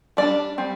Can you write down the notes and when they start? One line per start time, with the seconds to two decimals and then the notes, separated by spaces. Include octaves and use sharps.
0.17 G3 D4 D5
0.58 G3 C4